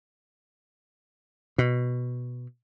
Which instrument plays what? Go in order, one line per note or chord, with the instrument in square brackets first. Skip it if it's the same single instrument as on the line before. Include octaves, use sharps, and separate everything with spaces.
[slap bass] B2